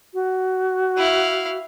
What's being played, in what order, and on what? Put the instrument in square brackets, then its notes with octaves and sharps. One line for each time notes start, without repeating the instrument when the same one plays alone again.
[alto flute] F#4
[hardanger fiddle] E4 F5